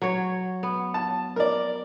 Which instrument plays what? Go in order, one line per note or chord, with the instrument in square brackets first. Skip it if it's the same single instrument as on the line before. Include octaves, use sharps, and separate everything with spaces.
[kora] F#3 C#5
B3
[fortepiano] A5
A#4 D5